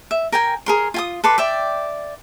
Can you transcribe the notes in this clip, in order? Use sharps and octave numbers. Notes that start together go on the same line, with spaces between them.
E5
A#4 G5 G#5
G#4 A#4 C6
F4 G#5 D#6
A4 B4 C6 D6
D5 E5 G5